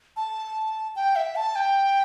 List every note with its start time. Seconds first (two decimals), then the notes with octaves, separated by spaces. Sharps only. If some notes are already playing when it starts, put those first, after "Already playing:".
0.17 A5
0.96 G5
1.16 E5
1.36 A5
1.55 G5